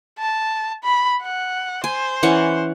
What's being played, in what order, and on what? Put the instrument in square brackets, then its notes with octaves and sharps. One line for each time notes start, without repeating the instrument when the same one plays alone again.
[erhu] A5
B5
F#5
[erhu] C5 [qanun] G#5
[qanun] E3 C#4 F#5